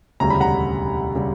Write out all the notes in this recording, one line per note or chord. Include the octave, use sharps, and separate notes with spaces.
E1 D2 C#3 G3 A#5
B5
F#5 A#5
C#3 G3